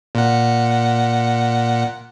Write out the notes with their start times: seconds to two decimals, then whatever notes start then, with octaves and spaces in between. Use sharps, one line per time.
0.15 A#2 F#5